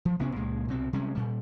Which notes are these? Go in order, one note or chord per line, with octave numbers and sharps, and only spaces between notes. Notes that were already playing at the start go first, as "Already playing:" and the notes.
F3
A1 C3 B3 C#4
C#2 A#2 G#3
C2 B2 C4
C3 G3 G#3 C#4
A#2 G3